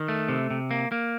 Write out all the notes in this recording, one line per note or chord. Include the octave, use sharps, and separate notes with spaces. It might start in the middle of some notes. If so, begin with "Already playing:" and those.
Already playing: D#3
A3
C3
C3
A#3
A#3